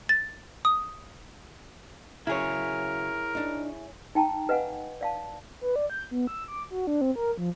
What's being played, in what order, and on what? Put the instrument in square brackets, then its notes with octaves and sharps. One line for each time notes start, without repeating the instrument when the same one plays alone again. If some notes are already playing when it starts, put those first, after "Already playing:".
[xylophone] A6
D#6
[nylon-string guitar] C#3 F#3 [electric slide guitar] E4 G#4 C#5 [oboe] A#4
[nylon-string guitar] D4 D#4
[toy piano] D#4 G5 A5 A#5
B4 D#5 F5 F#5 G#5
D5 F5 A5
[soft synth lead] B4
D5
G6
B3
E6
D6
F#4
D4
C4
A#4
F3